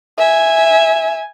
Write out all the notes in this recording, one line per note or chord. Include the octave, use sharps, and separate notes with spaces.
E5 G#5